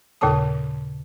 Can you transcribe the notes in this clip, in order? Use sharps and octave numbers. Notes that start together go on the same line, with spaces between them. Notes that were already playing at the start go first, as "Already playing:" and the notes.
D#2 A#2 C#3 A4 A5 D#6